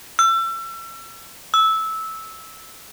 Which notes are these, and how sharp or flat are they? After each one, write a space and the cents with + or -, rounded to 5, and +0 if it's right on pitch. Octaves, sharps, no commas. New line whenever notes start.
E6 +35
E6 -15